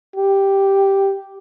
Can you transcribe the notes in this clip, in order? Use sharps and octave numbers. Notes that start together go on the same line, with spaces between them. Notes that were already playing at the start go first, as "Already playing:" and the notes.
G4